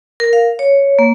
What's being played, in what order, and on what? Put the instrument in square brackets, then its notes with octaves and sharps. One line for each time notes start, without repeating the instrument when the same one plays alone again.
[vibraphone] A#4
F5
C#5
A#3